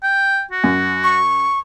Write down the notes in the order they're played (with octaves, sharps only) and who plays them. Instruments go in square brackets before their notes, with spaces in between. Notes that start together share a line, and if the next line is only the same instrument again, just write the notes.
[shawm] G5
F#4
[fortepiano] F#2
[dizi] C#6